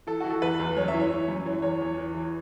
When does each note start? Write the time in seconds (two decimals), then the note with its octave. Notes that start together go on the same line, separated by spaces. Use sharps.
0.07 E3 A4
0.21 E3 F#4
0.30 A4
0.42 E2 B4
0.59 E2
0.76 F#2 C#5
0.88 E5
0.94 E3
0.99 C#5
1.11 E3
1.28 F#2
1.46 E3 C#5
1.62 E2 C#5
1.81 E2
1.98 E3
2.14 E3